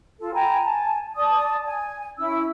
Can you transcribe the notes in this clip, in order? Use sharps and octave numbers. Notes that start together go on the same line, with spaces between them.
F4 A4
G5 G#5 A#5 B5
G#5 A5
D5 A5 D#6
G#5
C#4 E4 E6